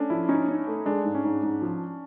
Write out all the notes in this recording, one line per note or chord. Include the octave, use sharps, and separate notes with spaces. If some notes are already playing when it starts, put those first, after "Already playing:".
Already playing: A3 C#4 D4
F3 E4
C#4 D#4
C#4
A3
G#3 D4
G#2
C#4
G#2
G#2
F3